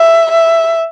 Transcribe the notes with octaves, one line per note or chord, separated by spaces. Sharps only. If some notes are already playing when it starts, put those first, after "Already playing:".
Already playing: E5
E5